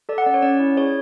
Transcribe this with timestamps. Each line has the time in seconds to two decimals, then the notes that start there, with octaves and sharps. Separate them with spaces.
0.09 A4 D5
0.18 F#5
0.26 C#4 D5
0.34 C#5
0.42 C#4 D5
0.59 E4
0.77 G#4 C#5